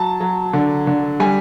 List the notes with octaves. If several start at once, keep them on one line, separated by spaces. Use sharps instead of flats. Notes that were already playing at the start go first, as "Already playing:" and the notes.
Already playing: F#3 A5
F#3
D3
D3
G3 G#5